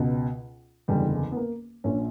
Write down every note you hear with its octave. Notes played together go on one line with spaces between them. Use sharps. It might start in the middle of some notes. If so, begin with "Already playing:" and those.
Already playing: C#2 B2
F#1 E2 D3 G3
B3
A#3
A#1 A#2 C#4